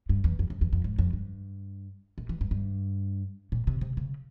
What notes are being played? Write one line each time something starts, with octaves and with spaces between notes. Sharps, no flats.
G2
E2
F2
F2
E2
F2
G#2
F2
G2
A#2
E3
G2
G2
A#2
C3
C3
C#3